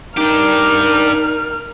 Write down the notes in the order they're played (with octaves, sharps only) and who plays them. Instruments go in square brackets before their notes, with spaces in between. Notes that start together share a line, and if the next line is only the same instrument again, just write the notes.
[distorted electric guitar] D4 G4 [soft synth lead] D#4 [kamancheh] A#4 F6